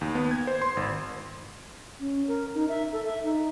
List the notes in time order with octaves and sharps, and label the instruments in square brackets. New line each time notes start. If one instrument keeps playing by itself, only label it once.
[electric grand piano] D#2
B3
G#6
C5
C6
G#1
[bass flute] C#4
A#4
D#4
E5
A4
E5
D#4